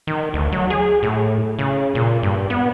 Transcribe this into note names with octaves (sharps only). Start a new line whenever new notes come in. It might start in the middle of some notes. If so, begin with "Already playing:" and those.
D#3
D2
F#3
G#4
A2
C#3
A#2
G2
B3